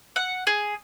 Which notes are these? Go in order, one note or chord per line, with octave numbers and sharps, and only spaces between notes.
F#5
G#4